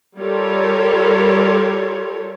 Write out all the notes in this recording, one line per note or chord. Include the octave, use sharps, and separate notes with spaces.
G3 F4 A4 A#4 C#5